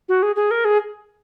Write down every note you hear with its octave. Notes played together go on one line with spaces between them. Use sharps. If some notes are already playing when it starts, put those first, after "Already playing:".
F#4
G#4
G#4
A#4
G#4